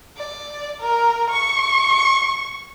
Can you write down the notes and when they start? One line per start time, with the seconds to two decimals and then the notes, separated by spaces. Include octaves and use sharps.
0.17 D5
0.81 A#4
1.31 C#6